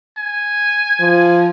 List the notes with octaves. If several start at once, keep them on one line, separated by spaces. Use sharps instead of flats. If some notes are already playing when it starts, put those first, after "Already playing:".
G#5
F3